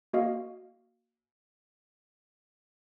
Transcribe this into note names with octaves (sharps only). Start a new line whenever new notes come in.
A#3 F#4 D#5 F5